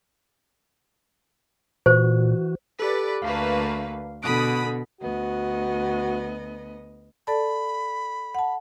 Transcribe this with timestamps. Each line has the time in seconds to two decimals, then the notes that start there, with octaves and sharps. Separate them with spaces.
1.86 A#2 E3 F#4 C5
2.79 G4 A4 B4 D5
3.22 D2 A3 A#3 B4 F5
4.23 B2 D3 B5 D#6 F#6 D7
5.01 D2 B3 F#4 D#5
7.27 A4 D5 A5 B5
8.35 F#5 A5